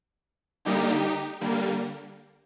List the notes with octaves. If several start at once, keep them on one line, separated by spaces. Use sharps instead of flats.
D3 G3 A#3 D#4 G4
D3 G3 A#3